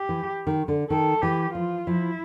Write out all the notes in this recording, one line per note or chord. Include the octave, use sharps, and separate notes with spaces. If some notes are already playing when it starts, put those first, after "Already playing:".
Already playing: G4
E3
D#3
D3
D#3 A4
E3 G4
F3 F4
F3 E4